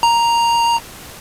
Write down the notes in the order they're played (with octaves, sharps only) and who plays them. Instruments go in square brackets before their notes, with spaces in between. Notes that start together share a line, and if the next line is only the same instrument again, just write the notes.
[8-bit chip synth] A#5